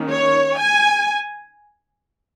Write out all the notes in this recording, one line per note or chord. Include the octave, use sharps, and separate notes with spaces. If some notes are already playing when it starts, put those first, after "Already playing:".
Already playing: D#3 A#3 C#4
C#5
G#5